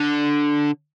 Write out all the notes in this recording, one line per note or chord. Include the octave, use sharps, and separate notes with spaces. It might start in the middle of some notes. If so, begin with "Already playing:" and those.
Already playing: D3